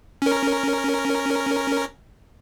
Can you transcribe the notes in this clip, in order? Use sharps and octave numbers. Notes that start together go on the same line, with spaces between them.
C#4 A#4